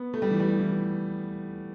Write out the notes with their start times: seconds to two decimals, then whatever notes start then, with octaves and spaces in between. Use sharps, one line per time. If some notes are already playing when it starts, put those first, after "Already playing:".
Already playing: B3
0.14 A3
0.22 G3
0.31 E3
0.40 G3
0.59 E3